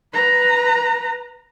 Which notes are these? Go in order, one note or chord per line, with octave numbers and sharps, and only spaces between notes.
B4 A#5